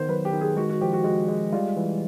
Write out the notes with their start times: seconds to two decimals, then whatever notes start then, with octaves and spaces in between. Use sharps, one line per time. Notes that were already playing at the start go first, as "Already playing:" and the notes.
Already playing: D#3 B3 C5
0.09 F#3 B4
0.25 G4
0.33 D#3
0.41 G#4
0.56 G#3 F#4
0.69 F#4
0.81 F3 G4
0.93 F#4
1.04 G#3 F#4
1.28 G#3
1.52 G3 F4
1.77 E3